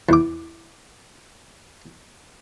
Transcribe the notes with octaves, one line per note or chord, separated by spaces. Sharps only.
E2 D6